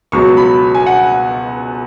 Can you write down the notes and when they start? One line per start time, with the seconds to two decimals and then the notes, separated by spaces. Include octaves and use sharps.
0.12 C#2 B2 F#3 C#6
0.37 B5
0.75 G#5
0.86 F#5